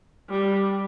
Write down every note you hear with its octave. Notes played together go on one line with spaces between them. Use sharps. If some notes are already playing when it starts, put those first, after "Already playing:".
G3